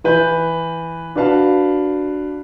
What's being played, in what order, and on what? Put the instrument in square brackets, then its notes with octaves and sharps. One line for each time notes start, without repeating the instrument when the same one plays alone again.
[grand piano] E3 B4 G6
D4 F#4 B4 F5 A5